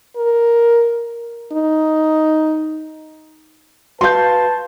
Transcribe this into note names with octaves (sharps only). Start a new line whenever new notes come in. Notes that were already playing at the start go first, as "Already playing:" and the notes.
A#4
D#4
F#4 B4 F5 A5 C6 G6